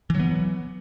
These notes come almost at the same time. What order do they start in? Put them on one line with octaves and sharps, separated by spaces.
E3 F#3 B3